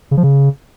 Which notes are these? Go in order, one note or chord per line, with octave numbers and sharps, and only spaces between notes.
C#3
F3
C#3